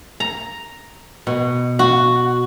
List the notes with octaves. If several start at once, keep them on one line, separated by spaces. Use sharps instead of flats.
A#5
B2
F#4